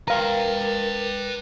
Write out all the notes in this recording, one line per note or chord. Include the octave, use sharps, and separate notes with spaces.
A#4 B4 F5 G5 A#5